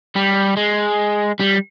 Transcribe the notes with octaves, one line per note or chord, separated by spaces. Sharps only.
G3
G#3
G3